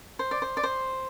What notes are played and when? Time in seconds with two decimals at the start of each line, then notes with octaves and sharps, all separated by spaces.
0.19 C5
0.31 D5
0.42 C5
0.57 D5
0.63 C5